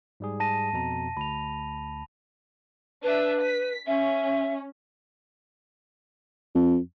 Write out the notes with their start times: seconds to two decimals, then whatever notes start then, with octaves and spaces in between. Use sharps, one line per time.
0.20 G#2 G3 G#4
0.40 A5 A#6 D#7
0.73 F2 B2 A#5
1.17 D2 B5 F7
3.03 D4 B4 E5
3.40 B6
3.86 C#4 E5
6.55 F2